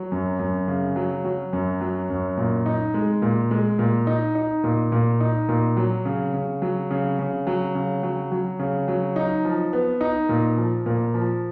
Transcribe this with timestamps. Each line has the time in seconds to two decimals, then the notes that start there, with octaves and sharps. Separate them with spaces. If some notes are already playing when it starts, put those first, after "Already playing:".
Already playing: F#3
0.12 F#2
0.39 F#2
0.68 C#3
0.96 F#3
1.25 F#3
1.53 F#2
1.81 F#3
2.10 F#2
2.37 A#2
2.66 D#4
2.94 G#3
3.22 A#2
3.51 G#3
3.79 A#2
4.07 D#4
4.35 D#4
4.64 A#2
4.92 A#2
5.21 D#4
5.49 A#2
5.77 F#3
6.05 C#3
6.34 C#3
6.62 F#3
6.91 C#3
7.19 C#3
7.47 F#3
7.75 C#3
8.03 F#3
8.32 F#3
8.59 C#3
8.88 F#3
9.16 D#4
9.45 F3
9.73 B3
10.01 D#4
10.29 A#2
10.57 F3
10.86 A#2
11.14 F3